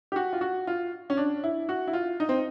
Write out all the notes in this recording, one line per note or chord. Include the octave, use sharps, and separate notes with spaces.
G4
F#4
F4
F#4
F4
C#4
D4
E4
F#4
E4
F4
D#4
C4